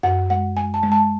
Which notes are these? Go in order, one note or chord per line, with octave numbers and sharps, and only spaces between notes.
F#2 F#5
G#3 F#5
G#3 G#5
A5
G#3
A5